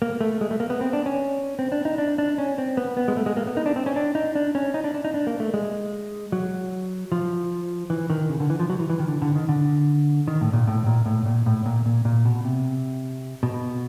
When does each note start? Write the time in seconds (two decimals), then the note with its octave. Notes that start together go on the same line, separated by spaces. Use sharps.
0.02 A#3
0.21 A3
0.41 G#3
0.51 A3
0.60 A#3
0.70 B3
0.81 C4
0.93 D4
1.06 C#4
1.59 C4
1.72 D4
1.85 D#4
1.98 D4
2.18 D4
2.38 C#4
2.58 C4
2.77 B3
2.97 B3
3.08 G#3
3.17 A3
3.26 G#3
3.37 A#3
3.47 B3
3.57 D#4
3.66 D4
3.76 C4
3.86 C#4
3.96 D4
4.15 D#4
4.35 D4
4.55 C#4
4.74 D#4
4.84 D4
4.94 D4
5.05 D#4
5.14 D4
5.27 A#3
5.40 A3
5.54 G#3
6.32 F#3
7.12 F3
7.90 E3
8.10 D#3
8.29 C#3
8.40 D3
8.50 E3
8.60 F3
8.70 F#3
8.79 E3
8.90 E3
8.99 D#3
9.08 D3
9.22 D3
9.35 D#3
9.49 D3
10.28 D#3
10.41 A2
10.53 A#2
10.67 A2
10.86 A#2
11.06 A2
11.26 A#2
11.46 A2
11.66 A#2
11.86 A#2
12.05 A#2
12.25 B2
12.45 C3
13.43 B2